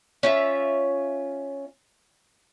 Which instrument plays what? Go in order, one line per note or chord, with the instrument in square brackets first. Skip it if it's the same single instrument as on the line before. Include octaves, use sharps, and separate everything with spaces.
[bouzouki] C#4 F4 E5